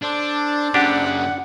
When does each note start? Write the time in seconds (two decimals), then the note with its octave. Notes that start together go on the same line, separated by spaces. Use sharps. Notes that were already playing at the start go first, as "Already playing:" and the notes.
0.03 D4 A4 C5 D5
0.74 F#2 C#3 D4 G4 F#5